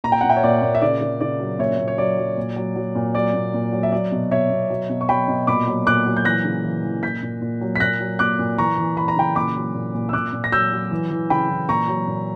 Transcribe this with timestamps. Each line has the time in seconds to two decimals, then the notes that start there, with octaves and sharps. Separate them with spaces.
0.04 A#2 A#5
0.12 G5
0.21 A#2 F#5
0.29 E5 G5
0.36 C#5
0.43 A#2 D5
0.62 A#2
0.75 E5
0.82 C#3 D5
1.01 C#3
1.21 C#3 D5
1.40 F#3
1.59 A#2 C#5 E5
1.79 A#2
1.88 C#5
1.98 F#3 D5
2.18 F#3
2.37 A#2
2.56 F#3
2.76 F#3
2.95 A#2
3.15 F#3 D5
3.34 A#2
3.54 A#2
3.73 F#3
3.83 E5
3.92 F#3 D5
4.12 B2
4.31 B2 C#5 E5
4.51 B2
4.70 F#3
4.90 B2
5.01 C#6
5.09 F#3 G5 B5
5.28 B2
5.47 A#2 B5 D6
5.68 F#3
5.87 A#2 D6 F#6
6.06 F#3
6.17 G6
6.25 E3 F#6 A#6
6.45 C#3
6.64 E3
6.83 E3
7.03 A#2 G6 B6
7.23 A#2
7.41 A#2
7.61 F#3
7.76 B6
7.80 A#2 F#6 A#6
8.00 F#3
8.19 A#2 D6 F#6
8.39 A#2
8.58 E3 A#5 C#6
8.78 E3
8.97 E3 B5
9.08 A#5
9.16 C#3 G5 B5
9.35 A#2 B5 D6
9.56 F#3
9.75 A#2
9.94 A#2
10.09 E6
10.13 A#2 D6 F#6
10.33 A#2
10.44 A#6
10.52 F#3 E6 G6
10.72 F#3
10.91 E3
11.11 E3
11.30 C#3 G5 B5
11.49 E3
11.69 A#2 A#5 C#6
11.88 F#3
12.07 A#2